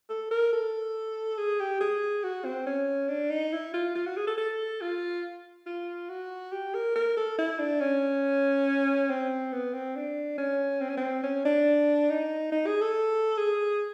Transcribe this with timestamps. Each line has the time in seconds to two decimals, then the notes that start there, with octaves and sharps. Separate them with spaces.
0.10 A4
0.31 A#4
0.53 A4
1.38 G#4
1.60 G4
1.81 G#4
2.23 F#4
2.45 C4
2.66 C#4
3.09 D4
3.30 D#4
3.53 E4
3.74 F4
3.95 F4
4.06 F#4
4.17 G#4
4.27 A4
4.37 A4
4.81 F4
5.66 F4
6.09 F#4
6.52 G4
6.74 A#4
6.96 A#4
7.17 A4
7.38 E4
7.59 D4
7.80 C#4
9.10 C4
9.52 B3
9.74 C4
9.96 D4
10.38 C#4
10.81 C4
10.89 C#4
10.97 C4
11.23 C#4
11.45 D4
12.10 D#4
12.52 D#4
12.67 G#4
12.81 A4
13.38 G#4